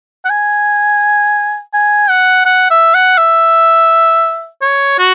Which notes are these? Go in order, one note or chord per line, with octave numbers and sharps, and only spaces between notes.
F#5
G#5
G#5
F#5
F#5
E5
F#5
E5
C#5
F#4